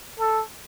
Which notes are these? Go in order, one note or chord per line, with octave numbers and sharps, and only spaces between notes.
A4